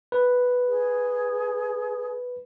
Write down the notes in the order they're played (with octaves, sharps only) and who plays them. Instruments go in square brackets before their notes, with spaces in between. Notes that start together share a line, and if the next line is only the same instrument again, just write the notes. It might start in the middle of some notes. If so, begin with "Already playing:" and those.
[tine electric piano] B4
[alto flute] G#4